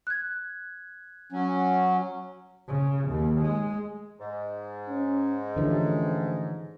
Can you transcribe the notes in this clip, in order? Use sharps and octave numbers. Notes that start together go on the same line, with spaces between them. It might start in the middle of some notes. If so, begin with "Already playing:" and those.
F#6 G#6
F#3 C#4
C#3
D#2
G#3
G#2
C#4
D3 E3 F3 A3 C#4 G4